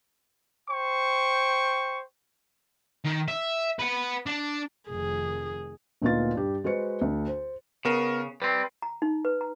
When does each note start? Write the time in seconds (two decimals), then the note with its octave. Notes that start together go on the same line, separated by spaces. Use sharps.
0.69 C5 G5 C#6
3.05 D#3
3.28 E5
3.79 B4 F#5
4.26 D4
4.89 F1 F2 D#3 G#4
6.02 D2 A#2 B3 D#4 F4 A6
6.34 G2 G4
6.64 G#3 F#4 B4 C5 C#7
7.01 D2
7.27 C5
7.85 C#3 B3 A#4
8.42 G3 C4 B4
8.82 A#5
9.02 D#4
9.25 B4
9.41 A#5